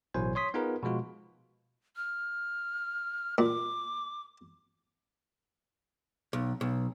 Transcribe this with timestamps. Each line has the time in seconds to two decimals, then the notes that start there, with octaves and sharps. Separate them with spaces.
0.14 A1 B2 F#3 E4 C5 G#5
0.35 C#5 C6 D#6 B6
0.54 B3 D#4 F4 G#4 A#4 B4
0.83 B2 F3 G#3 F4 F#4
1.96 F6
3.38 A#2 D6
6.33 B1
6.61 B1